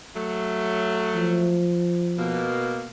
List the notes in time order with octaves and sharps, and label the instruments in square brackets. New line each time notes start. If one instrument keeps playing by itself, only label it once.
[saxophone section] F#3 A3
[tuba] F3
[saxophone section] B2 A#3